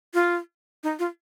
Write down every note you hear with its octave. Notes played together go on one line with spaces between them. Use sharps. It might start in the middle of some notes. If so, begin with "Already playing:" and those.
F4
D#4
F4